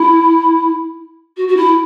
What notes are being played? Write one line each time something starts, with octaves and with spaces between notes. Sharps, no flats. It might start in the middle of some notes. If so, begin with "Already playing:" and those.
Already playing: E4
F#4
F#4
E4